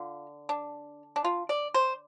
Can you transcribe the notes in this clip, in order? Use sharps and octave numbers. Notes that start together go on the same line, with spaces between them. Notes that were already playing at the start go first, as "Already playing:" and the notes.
Already playing: D3 F4
D4
D4
F4
D5
C5